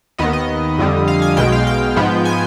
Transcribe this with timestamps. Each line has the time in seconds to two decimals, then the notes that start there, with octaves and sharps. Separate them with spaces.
0.18 D#2 D#3 B3 D#5
0.33 D#5
0.78 F2 D3 G3
1.08 F5
1.22 G#5
1.37 B1 B2 G#3 G5
1.52 F5
1.67 G5
1.96 G#2 F3 G#3 B3
2.25 G#5